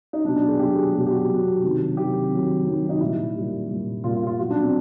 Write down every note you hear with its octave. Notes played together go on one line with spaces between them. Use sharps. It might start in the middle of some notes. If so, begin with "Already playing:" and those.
D#4
B2 F#3 D4
D4
G#4
B2 F#3 G4
G#4
B2 F#3 G4
G4
F#4
B2 F#3
C3 D#3 F#3
C3 D#3 F#3 G4
C3 D#3 F#3
C3 D#3 F#3
D#4
A#2 G3 E4
A#2 G3
A#2 G3
A#2 G3 F4
F4
F4
B2 F#3 F#4
D4
C4